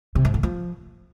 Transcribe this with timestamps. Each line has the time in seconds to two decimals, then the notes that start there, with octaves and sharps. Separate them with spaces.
0.15 C3
0.25 G#2
0.34 D3
0.43 F3